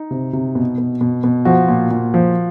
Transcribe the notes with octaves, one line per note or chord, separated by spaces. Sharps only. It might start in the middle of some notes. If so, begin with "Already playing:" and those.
Already playing: D#4
C3
C3
B2
B2
B2
B2
F3 F#4
A#2
A#2
F3